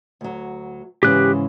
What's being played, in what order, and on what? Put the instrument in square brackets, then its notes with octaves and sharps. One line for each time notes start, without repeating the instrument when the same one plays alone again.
[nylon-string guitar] D2 F#3
[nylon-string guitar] G#2 C#3 E3 [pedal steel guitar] G4 F#6